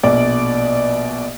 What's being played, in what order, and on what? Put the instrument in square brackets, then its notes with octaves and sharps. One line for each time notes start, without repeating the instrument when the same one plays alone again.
[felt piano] A#1 B2 D5